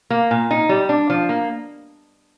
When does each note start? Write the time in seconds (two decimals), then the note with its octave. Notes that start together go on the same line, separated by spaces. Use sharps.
0.10 A#3
0.31 A#2
0.51 D#4
0.69 G3
0.89 D4
1.10 F3
1.29 A#3